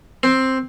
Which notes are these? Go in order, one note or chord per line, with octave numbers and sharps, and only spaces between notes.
C4